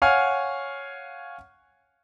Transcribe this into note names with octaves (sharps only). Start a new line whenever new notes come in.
C#5 F5 F#5 G#5 F6